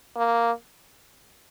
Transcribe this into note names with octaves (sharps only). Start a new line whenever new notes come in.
A#3